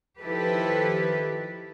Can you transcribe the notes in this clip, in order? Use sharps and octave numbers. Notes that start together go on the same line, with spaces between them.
D#3 F3 E4 G4 A4 B4